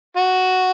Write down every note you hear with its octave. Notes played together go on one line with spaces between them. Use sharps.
F#4